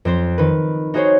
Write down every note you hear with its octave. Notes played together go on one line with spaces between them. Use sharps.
F2 C4 C5
D#3 B4
D#4 F#4 G#4 C5 C#5